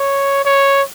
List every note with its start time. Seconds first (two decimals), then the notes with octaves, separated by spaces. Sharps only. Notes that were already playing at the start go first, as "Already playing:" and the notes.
Already playing: C#5
0.45 C#5